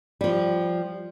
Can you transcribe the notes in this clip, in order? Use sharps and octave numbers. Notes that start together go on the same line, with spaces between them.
F3 G3